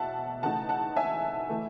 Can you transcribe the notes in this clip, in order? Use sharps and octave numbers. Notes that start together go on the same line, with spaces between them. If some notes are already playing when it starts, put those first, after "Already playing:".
Already playing: E2 B2 E5 F#5 A5
C#3 E3 A3 D#4 F#5 A5
F#5 A5
E5 G#5
E3 A3